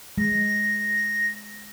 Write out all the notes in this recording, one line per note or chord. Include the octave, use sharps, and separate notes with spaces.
G#3 A#6